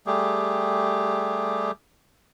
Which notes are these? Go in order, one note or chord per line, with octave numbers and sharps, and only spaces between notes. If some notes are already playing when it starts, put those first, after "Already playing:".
G3 A3 G4 G#4